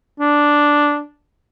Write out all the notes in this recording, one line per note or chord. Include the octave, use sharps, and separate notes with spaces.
D4